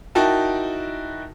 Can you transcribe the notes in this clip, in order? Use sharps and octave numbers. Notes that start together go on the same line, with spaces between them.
D#4 E4 F#4 A#4 G5 A5